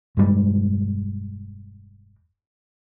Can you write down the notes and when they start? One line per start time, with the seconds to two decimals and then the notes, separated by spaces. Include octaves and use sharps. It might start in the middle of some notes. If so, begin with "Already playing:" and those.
0.17 E1 G2 G3 G#3